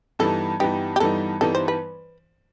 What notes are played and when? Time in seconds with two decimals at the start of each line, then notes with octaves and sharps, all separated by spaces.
0.19 G2 E3 G3 B3 D#4 A4
0.60 G2 E3 G3 B3 D#4 G4
0.96 G4
1.00 G2 E3 G3 B3 D#4 A4
1.41 G2 E3 G3 B3 D#4 A4
1.55 C5
1.68 B4